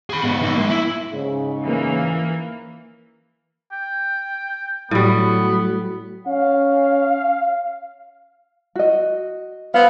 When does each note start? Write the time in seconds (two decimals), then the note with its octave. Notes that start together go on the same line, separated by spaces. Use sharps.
0.10 G#4 B5
0.23 G#2 B3
0.40 C#2 D#4
0.55 G#3 A#3
0.69 E4
1.11 G#2 C#3
1.62 E3 A#3
3.72 G5
4.91 A2 F#3 G3 B3
6.27 C#4 F5
8.75 F#4 D#5
9.74 B3 C4 F5